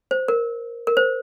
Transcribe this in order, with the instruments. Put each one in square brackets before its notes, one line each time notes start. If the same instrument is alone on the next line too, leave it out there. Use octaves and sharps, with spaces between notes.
[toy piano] C5
A#4
A#4
C5